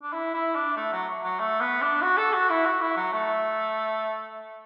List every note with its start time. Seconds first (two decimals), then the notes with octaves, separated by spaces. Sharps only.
0.03 D4
0.13 E4
0.34 E4
0.55 D4
0.76 A3
0.92 F#3
1.23 F#3
1.39 A3
1.60 B3
1.82 D4
2.02 F#4
2.18 A4
2.33 F#4
2.50 E4
2.65 F#4
2.81 E4
2.96 F#3
3.12 A3